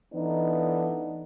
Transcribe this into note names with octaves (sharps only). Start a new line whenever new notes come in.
E3 A3 B3 D4 D#4